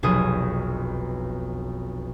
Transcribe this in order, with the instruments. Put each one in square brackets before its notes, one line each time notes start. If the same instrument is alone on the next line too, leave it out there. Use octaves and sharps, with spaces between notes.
[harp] F1 B1 G#4 D#6